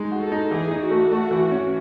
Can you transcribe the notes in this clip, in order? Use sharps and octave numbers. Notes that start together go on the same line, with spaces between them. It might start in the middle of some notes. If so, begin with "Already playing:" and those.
Already playing: G#3 D#4
F#4
A4
D#4
E3 G#4
D#4
F#4
A3
A3
E3
C#4